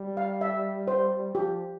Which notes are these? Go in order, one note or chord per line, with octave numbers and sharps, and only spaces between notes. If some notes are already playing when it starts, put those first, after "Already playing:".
Already playing: G3
F5
E5
C5
F3 G4